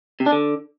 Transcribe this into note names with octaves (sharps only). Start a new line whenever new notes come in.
C3
D4
D3